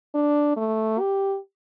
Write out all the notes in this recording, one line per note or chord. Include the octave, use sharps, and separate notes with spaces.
D4
A3
G4